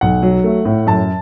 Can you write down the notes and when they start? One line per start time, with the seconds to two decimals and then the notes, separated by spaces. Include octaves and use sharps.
0.01 B1 F#5
0.22 F#3
0.44 A3
0.65 A2
0.87 F#2 A5